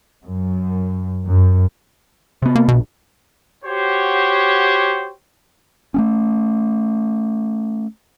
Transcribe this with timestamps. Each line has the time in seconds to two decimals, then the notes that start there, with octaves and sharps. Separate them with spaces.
0.25 F#2
1.25 F#2
2.42 C3 B3
2.56 A#3
2.68 D1 A#1 B2
3.64 F#4 G4 C5 C#5
5.94 A3 A#3 C#4